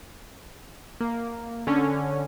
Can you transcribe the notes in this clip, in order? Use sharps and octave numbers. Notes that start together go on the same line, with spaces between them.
A#3
D3 C#4